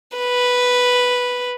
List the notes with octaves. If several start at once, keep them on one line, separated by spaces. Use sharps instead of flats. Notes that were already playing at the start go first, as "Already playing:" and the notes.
B4